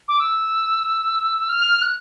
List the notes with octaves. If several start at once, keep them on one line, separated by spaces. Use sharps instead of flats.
D6
E6
F6
F#6